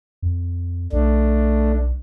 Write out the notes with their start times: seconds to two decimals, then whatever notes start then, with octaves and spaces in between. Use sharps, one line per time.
0.22 F2
0.93 B1 A3 D4